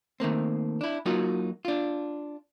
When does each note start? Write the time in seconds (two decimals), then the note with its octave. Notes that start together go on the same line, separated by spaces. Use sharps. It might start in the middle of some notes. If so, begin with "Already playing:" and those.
0.20 D#3 A3 A#3 C4
0.81 D4 E4
1.06 F#3 A#3 D#4 F4 F#4
1.65 D4 F4